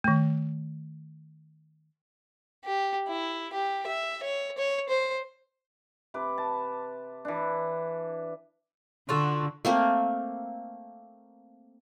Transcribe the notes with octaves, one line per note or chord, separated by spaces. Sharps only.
D#3 A3
G4
E4
G4
E5
C#5
C#5
C5
C3 B4 D6
A5
E3 D4
D3 F4 F#4 A4
A3 A#3 C4